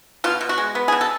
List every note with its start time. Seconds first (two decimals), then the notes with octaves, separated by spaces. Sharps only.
0.24 B2 F4
0.41 B2
0.49 F#4
0.58 G#3
0.75 B3
0.88 G#4
0.92 B2
1.01 A4